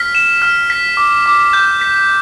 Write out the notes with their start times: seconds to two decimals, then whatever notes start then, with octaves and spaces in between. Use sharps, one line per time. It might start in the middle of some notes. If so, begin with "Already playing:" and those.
Already playing: F6 B6
0.15 E7
0.42 F6
0.70 B6
0.97 D6
1.26 D6
1.53 G6
1.81 B6